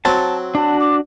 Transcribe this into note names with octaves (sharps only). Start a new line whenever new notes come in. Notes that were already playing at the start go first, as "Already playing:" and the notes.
F#3 C4 A5
D4 F#4 A5
D6